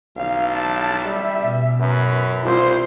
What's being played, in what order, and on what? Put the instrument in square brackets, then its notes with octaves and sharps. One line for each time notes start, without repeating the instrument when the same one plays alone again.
[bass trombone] B1 [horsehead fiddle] F5
[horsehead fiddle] A5
[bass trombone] G3 [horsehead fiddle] E5
[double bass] B2
[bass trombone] F#2 [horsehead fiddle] B4
[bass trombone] C2 [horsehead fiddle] F4 C5